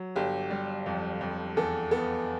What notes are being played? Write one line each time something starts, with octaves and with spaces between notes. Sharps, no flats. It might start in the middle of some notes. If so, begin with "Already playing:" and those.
Already playing: F#3
G1 G4
G3
F2
F2
E2 A4
B3 A4